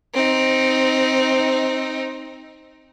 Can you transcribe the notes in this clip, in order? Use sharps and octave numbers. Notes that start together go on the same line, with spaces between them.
C4 D#4